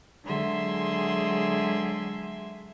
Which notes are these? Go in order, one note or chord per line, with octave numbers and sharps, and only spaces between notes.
D3 F#3 G#3 G#4 E5 C6